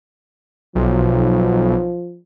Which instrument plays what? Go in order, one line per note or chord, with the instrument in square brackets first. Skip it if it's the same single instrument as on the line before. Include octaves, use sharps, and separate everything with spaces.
[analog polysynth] B1 [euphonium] F3